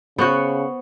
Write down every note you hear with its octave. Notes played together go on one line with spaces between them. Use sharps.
C#3 B3 F#4 C5 C#6 G6